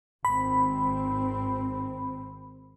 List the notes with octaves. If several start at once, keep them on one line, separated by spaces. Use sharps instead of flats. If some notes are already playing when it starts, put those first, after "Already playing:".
G#1 C4 B5